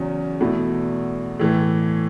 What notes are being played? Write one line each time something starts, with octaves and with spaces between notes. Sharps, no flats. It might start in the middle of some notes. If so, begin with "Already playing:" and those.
Already playing: E2 C#3 F#3 C#4
E2 B2 A3 E4
A2 E3 A3